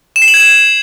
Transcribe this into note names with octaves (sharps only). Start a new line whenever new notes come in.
E7
C7
F#7
G#6
E7